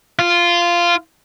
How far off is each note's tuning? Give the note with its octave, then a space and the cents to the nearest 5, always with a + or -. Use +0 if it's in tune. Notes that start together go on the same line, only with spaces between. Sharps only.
F4 -10